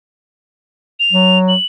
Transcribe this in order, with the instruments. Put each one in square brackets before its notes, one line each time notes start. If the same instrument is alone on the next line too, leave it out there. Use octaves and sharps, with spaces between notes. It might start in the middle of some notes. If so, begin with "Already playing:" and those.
[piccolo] F7
[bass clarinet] F#3
[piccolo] F#7